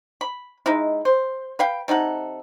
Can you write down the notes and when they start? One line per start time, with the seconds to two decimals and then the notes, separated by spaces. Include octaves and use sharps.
0.21 B5
0.66 G#3 D#4 E4
1.05 C5
1.59 B4 F5 G5
1.88 C3 D#4 A4 F#5